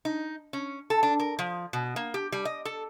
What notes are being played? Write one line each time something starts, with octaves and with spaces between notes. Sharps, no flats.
D#4
C#4
A4
D4
A#4
F3
B2
A#3
G4
G3
D#5
A4